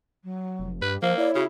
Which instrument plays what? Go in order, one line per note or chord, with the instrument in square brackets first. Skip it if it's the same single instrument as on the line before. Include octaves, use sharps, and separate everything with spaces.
[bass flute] F#3
[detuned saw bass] F1
[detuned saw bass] G2 [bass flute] G4 [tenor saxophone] B4
[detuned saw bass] F3 [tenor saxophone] A#3 [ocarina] C5 [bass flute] F5
[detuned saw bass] E4 [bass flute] C#5 [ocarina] D5
[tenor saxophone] C#3 [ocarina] F#4